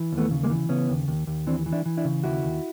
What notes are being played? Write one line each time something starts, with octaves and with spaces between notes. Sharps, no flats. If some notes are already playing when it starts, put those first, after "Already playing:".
Already playing: E3
D#2
A3 B3
C#3
G#3 A#3
E3
C#3 B3 C#4
D#2
D#2
D#2
E3 C4 D4
E3
D4 E4
E3
D4 E4
C#3
D#2 E4 F#4
D#2